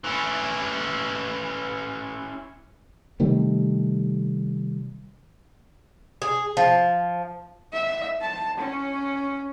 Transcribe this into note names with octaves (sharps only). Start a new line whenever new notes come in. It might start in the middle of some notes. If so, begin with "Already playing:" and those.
E3 C#4
C3 D#3 G3 A3
G#4
F3
E5
A5
C#4